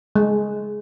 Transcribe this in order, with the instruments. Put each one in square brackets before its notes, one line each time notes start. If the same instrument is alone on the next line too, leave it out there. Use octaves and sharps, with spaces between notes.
[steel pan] G#3